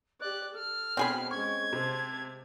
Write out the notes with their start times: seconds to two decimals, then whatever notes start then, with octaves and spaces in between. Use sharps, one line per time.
0.20 G4 D5 F#6
0.54 A4 F6
0.97 B2 C4 G#4 B5
1.31 G#3 C#4 C#6 G#6
1.73 C3 C5 A5